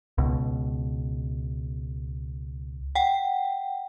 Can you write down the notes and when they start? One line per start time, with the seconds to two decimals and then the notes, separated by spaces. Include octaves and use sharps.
0.18 C#2 B2
2.95 F#5 G5